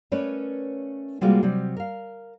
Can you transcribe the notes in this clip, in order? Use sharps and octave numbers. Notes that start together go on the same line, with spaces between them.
A3 C#4 A#4 B4 C#5 D5
C3 G3 G#3 A#3 F4 F#4
C3 F#3 G3
A#4 F5